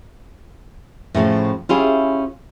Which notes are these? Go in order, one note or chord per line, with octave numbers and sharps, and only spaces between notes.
A2 C#3 E3 F3
C#4 E4 F4 G4 G#4